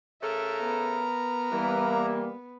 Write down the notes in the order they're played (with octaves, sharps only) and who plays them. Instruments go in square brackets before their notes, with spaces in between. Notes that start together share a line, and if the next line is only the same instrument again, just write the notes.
[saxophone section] C#3 A3 A4 [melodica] A#4 A#5 [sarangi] E5
[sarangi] B3
[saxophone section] E3 [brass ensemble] G3 A#3